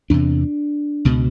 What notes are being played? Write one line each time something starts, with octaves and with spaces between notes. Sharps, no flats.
E2 C3 D4
C#2 B2